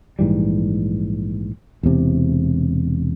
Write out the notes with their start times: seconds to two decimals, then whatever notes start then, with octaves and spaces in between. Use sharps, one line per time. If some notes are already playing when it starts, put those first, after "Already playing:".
0.19 A#1 G#2 E3 G3
1.83 E1 E2 C3